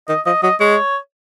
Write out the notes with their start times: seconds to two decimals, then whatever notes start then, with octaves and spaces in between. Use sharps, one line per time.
0.09 D#3 D#5
0.26 F3 D#5
0.43 F#3 D#5
0.60 G#3 C#5